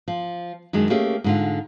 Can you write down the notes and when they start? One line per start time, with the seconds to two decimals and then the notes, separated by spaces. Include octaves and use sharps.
0.08 F3
0.73 F#2 D#3 G#3 D4
0.90 A3 A#3 C#4 G4 G#4
1.24 G#2 D3 F4